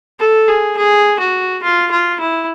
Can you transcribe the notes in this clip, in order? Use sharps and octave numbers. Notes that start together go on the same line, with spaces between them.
A4
G#4
G#4
F#4
F4
F4
E4